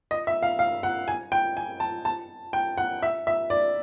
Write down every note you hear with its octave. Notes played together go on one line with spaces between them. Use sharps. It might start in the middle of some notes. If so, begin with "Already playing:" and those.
D#5
E5
F5
F5
F#5
G#5
G5
G#5
A5
A5
G5
F#5
E5
E5
D5